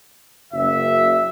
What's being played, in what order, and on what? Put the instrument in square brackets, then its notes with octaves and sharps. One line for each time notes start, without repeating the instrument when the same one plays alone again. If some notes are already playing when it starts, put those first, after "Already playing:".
[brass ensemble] F#1 E5